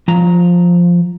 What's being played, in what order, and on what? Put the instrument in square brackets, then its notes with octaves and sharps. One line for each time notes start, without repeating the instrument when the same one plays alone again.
[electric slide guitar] F3 A#5